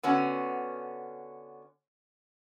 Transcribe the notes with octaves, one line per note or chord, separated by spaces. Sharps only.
D3 B3 C#4 F#4